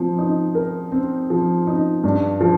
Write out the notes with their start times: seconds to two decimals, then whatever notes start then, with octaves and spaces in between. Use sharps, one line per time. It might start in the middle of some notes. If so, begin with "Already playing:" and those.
Already playing: F3 C4
0.18 D#4
0.55 A#4
0.92 C4
1.30 F3
1.67 D#4
2.04 G2
2.41 F3